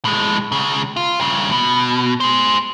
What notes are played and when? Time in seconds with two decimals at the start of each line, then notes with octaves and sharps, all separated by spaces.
0.05 A2 G#3
0.52 C#2 C#3
0.96 F4
1.20 G2 C#3
1.52 B2
2.20 G#4 C5